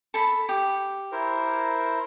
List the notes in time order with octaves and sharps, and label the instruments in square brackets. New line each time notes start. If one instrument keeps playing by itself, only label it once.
[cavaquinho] A4 A5 B5
G4
[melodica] E4 A#4 C5